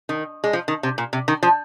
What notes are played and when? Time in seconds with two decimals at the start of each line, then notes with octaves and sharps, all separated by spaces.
0.09 D#3
0.44 G#3
0.53 F3
0.68 D#3
0.83 C3
0.98 A#2
1.13 C3
1.28 D#3
1.43 F3